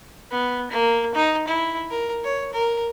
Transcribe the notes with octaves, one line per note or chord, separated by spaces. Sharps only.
B3
A#3
D#4
E4
A#4
C#5
A#4